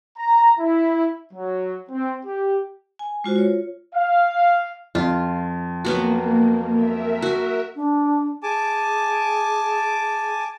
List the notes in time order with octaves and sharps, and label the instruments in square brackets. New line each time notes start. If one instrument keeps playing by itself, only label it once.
[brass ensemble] A#5
E4
F#3
C4
G4
[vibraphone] G#5
G#3 F4 F#4 C5
F4 C#5
[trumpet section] F5
[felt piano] F2 [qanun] F4
[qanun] F#3 B3 F#4 [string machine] A#3
[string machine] A#4 E5
[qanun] F#4
[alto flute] D4
[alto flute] G#4 [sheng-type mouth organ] G#5 A5 D6